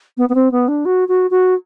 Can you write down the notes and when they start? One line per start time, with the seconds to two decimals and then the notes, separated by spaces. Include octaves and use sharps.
0.17 B3
0.29 B3
0.35 C4
0.51 B3
0.68 D4
0.85 F#4
1.08 F#4
1.30 F#4